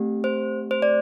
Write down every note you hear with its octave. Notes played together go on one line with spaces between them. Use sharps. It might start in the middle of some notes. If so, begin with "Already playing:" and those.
Already playing: A3 C4 G4
C5
C5
D5